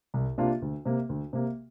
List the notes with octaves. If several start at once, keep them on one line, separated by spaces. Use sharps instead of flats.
C2
C3 A#3 D4 F4
D2
C3 A#3
D2
C3 A#3